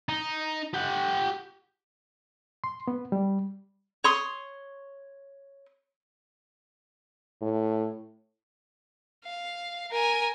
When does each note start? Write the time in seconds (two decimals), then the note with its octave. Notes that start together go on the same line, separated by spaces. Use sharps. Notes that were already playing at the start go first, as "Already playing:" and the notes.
0.09 D#4
0.73 G4 F#5
2.64 C6
2.88 B3
3.12 G3
4.04 C#5 C6 D#6
7.42 A2
9.25 F5
9.92 A#4 G#5